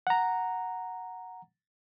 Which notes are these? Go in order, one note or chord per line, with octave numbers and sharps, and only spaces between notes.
F#5 A#5